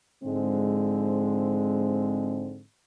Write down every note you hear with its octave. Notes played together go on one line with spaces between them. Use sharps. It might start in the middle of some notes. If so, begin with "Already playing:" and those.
G#2 D3 F3 G#3 C4